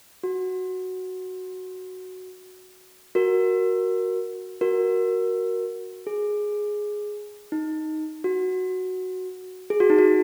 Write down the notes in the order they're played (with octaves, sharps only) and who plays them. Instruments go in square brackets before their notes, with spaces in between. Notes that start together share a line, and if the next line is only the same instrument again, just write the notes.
[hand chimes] F#4
F#4 A#4
F#4 A#4
G#4
D#4
F#4
G#4
F#4
D#4
F#4